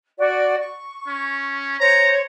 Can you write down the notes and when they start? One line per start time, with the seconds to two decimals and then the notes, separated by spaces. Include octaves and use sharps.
0.18 F#4 D5
0.58 C#6
1.07 C#4
1.80 C5 C#5 A#5